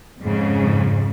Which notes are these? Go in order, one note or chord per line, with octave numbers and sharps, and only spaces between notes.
F2 G#2 C#3